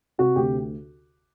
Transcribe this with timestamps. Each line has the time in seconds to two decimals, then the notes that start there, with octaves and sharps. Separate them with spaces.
0.18 C3 F#4
0.36 D2 G4